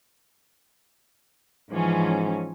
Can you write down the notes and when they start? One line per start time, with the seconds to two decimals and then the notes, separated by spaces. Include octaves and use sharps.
1.70 G#2 E3 F3 C#4